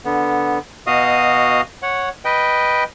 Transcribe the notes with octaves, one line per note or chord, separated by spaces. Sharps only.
D3 B3
B2 F#4 D#5 F5 D#6
C#5 F#5
B4 D#5 G5